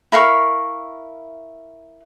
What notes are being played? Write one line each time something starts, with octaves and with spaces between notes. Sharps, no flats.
E4 A#4 F5 C#6